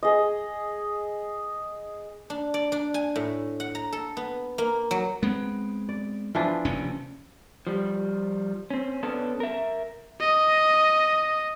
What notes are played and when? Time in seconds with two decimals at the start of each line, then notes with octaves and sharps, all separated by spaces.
0.03 G#4 D#5
2.30 D4
2.54 D5
2.72 D4
2.94 G#5
3.16 A2
3.60 F#5
3.75 A#5
3.93 A4
4.17 B3
4.58 A#3
4.91 F#3
5.23 G#3 B3 C4
5.89 D5
6.35 E3 F3 D4
6.65 F1 D#2 C#4
7.67 F3 G3
8.70 C4 C#4
9.03 B3 C#4 D4 A4
9.40 A#4 E5
10.20 D#5